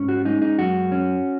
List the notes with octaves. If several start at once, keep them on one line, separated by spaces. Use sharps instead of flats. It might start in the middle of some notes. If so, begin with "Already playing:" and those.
Already playing: G#2 C#4
F#4
G#3 D#4
D#4
F#2 F#4
C#4